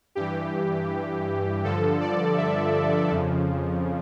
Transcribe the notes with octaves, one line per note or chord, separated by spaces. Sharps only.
G2 E3 G4
G2 D3 F3 A4
D5
E5
F2 C#3 F3